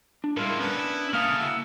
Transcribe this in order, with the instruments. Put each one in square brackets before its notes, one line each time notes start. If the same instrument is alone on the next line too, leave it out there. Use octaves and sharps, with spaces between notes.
[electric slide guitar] D4
[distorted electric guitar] A2 A#3 [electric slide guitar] G3 G#3 A#4 [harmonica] E4 F4
[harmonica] B3 [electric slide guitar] C#4 D4
[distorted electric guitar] E4
[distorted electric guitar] C#3 A3 [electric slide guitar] A#3 F5 [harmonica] D#6 F6
[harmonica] E4 F#4 E6